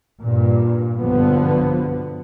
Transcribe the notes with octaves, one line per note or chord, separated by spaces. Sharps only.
G2 A#2
B1 G2 D3 F3 B3